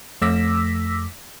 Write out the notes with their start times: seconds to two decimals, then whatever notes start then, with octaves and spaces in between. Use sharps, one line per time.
0.22 F2 A3 D6 E6 A#6 B6